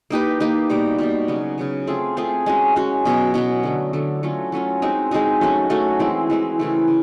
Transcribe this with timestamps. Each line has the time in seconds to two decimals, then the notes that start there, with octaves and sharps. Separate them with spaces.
0.10 A#3 D#4 G4 B4
0.40 A#3 D#4 G4 B4
0.70 B2 G3 A#3
0.98 B2 G3 A#3
1.28 C#3 F#3 B3
1.58 C#3 F#3 B3
1.87 A3 C4 F4 G#4
2.17 A3 C4 F4 G#4
2.46 G#3 C#4 F#4
2.76 G#3 C#4 F#4
3.05 B2 F#3 B3
3.34 B2 F#3 B3
3.63 D3 F#3 A3
3.93 D3 F#3 A3
4.23 F#3 A3 C#4 F4
4.52 F#3 A3 C#4 F4
4.82 G#3 C4 D#4 F#4
5.11 G#3 C4 D#4 F#4
5.41 F#3 A3 C#4 F#4
5.70 F#3 A3 C#4 F#4
5.99 E3 G#3 C4 E4
6.30 E3 G#3 C4 E4
6.59 C#3 E3 A3 C4
6.87 C#3